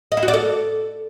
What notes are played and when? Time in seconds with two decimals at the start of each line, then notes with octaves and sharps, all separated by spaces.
0.12 D#5
0.17 E4
0.23 F#4
0.28 D5
0.34 A4